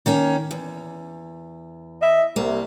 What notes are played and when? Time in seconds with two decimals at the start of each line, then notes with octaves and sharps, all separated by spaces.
0.06 D#3 A#3 C#4
0.51 E2
2.02 D#5 E5
2.36 C2 A#3